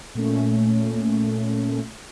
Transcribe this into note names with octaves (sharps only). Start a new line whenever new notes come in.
A#2 A3 C#4